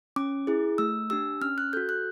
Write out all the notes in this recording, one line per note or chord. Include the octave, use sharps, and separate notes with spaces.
C#4 D6
E4 G#4
A3 E6
D4 G4 E6
C#4 F6
F#6
F#4 A4 G6
F#6